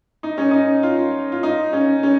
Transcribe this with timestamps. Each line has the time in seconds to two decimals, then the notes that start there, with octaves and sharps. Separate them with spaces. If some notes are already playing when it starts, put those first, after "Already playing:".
0.23 D#4
0.38 C#4
0.51 D#4
0.83 F4
1.32 F4
1.43 D#4
1.73 C#4
2.03 C#4